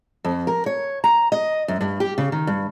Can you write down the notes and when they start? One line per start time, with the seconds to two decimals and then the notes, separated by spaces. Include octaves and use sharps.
0.25 F2
0.47 A#4
0.66 C#5
1.04 A#5
1.32 D#5
1.68 F#2
1.81 G2
2.00 G4
2.18 C#3
2.32 D#3
2.47 G2